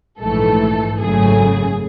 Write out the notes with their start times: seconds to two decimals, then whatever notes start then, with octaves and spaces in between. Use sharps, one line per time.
0.19 A#1 G#2 E3 A3 A4
0.98 G#1 F#2 C#3 F#3 A3 G#4